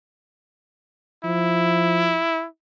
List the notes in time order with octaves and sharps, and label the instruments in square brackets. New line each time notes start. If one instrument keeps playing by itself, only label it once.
[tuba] F3 [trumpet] E4